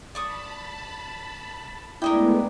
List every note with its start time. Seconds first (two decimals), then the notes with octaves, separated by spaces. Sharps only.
0.15 D5 A5 B5 C#6 D#6
2.02 G#3 A3 B3 D4 E4 A#4 D#5 G5